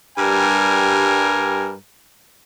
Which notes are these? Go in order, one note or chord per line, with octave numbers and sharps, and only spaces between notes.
G2 G3 A#4 G#5